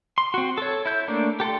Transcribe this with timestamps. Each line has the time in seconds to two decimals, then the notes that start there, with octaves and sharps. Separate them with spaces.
0.18 C6
0.34 C4 F#4
0.58 A4 C#5
0.86 E4 G6
1.08 A3 A#3 D4
1.40 G4 A4 G5 C6